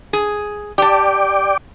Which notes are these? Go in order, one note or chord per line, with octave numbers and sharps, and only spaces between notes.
G#4
G4 D5 G5 A5 D6